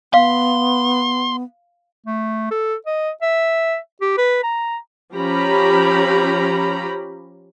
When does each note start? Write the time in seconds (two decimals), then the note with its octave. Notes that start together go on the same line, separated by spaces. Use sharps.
0.14 B3 F5 C6
2.06 A3
2.51 A4
2.86 D#5
3.22 E5
4.01 G4
4.17 B4
4.43 A#5
5.15 F3 C#4 G4 A#5 B5